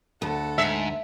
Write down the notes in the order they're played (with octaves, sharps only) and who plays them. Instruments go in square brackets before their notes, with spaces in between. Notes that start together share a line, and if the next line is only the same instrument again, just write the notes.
[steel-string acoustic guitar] D2 [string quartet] A4 F#5
[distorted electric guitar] G#2 [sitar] E5